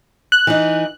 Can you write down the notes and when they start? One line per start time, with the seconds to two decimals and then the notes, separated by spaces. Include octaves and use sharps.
0.32 F#6
0.47 E3 D#4